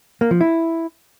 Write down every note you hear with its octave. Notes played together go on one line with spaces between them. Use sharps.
A#3
F3
E4